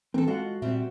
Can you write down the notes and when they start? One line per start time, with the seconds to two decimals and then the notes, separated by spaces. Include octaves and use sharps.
0.14 E3 C4 A4 A#4
0.28 G#3 F4 F#4 F#5
0.62 A#2 G3 C4 E5